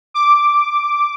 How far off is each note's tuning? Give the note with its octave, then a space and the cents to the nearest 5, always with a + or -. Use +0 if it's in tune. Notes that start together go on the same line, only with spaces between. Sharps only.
D6 +0